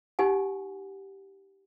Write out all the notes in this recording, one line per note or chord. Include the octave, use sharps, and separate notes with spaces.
D#4 G4 F#5 G#5